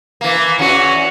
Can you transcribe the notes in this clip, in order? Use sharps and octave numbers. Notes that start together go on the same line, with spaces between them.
E3 A#3
E2 C#4 F#4